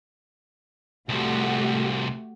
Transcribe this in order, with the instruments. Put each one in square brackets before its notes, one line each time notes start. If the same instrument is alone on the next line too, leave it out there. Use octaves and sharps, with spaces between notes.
[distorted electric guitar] C2 F3 [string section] A3 F#4 G4